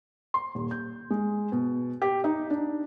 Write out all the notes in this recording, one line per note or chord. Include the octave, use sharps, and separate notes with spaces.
C6
D#1
G6
G#3
B2
G4
D#4
D4